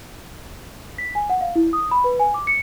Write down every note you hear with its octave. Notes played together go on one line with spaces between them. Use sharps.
B6
G#5
F#5
F5
E4
D#6
B5
B4
G#5
D6
C#7